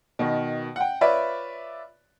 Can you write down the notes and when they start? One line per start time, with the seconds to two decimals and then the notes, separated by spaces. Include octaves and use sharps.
0.19 B2 D#3
0.76 F#5 G5
1.01 F4 B4 C#5 D5 E5